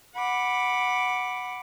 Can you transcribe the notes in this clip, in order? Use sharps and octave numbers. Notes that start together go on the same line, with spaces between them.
F#5 B5 D6